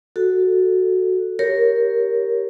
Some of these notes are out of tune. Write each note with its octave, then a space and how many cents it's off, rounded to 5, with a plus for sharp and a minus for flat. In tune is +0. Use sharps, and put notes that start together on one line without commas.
F#4 +0 A4 +0
G4 +0 A#4 +0 C#5 -5